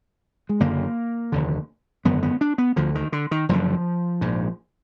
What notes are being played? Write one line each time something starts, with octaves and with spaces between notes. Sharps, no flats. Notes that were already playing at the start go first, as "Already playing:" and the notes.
G#3
F#1 F#2 D3 A#3
F1 D#2 D3
G#1 F#2 D3 B3
B3
D4
B3
D2 D3 F3
D#3
D3
D#3
F#1 F#2 D3 F3
A#1 G#2